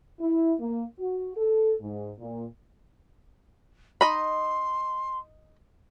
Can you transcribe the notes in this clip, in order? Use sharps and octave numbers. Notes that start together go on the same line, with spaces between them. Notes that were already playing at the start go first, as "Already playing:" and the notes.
E4
A#3
F#4
A4
G#2
A#2
D#4 D#5 B5 C6